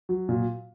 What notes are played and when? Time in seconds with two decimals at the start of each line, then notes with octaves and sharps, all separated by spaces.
0.09 F#3
0.29 A#2